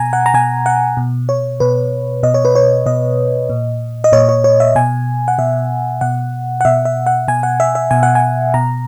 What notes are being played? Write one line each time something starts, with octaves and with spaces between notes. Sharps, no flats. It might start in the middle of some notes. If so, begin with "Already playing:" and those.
Already playing: B2 G#5 A#5
F#5
A#5
B2 G#5
F#5
B2
C#5
B2 B4
B2 D#5
C#5
B4
C#5
B2 D#5
A#2
D#5
A#2 C#5
C#5
C#5
E5
B2 G#5
F#5
B2 E5
B2 F#5
F#5
B2 E5
E5
F#5
B2 G#5
F#5
E5
E5
B2 G#5
F#5
G#5
B2 A#5